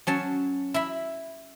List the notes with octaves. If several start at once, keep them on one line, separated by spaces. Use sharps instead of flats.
F#3 C#4 A5
E4 B5